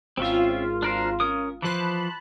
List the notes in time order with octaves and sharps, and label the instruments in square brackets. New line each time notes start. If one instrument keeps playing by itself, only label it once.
[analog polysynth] G#1 F4 [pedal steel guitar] C4 C#4 E5
[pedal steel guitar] D4 A#4 C5
C#4 A#4 D#6
[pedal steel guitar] E3 F3 C5 [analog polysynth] A5 B5 F#6